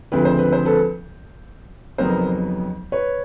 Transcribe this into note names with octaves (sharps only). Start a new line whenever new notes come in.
D2 C#3 F3 G#3 C4 B4
C5
B4
C5
A4 B4
F2 C#3 F#3 B3 D#4 A#4 C5
B4 C#5